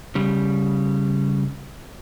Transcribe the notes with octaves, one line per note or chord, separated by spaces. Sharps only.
C#3 G3